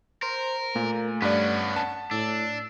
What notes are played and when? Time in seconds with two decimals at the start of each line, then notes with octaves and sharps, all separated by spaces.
0.22 A#4 C5
0.76 A#2 A3 A#3
1.22 G2 B3 C#4 D5 F#5
1.76 A5
2.11 A2 D4 E6